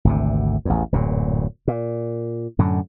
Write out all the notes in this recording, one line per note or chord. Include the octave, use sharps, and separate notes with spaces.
G#1 D2 C3
A1 E2
D1 F#2 A#2
A#2
F#2 A2 D3